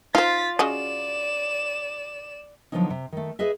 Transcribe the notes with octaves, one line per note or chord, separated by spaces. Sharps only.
D#4 F4 C5 A6 B6
C#3 F#4 D5 D#5 E7
D3 F3 F#3 B3 C#4 D#4
C3
D#3 A3
G#4 B4 D#5 E5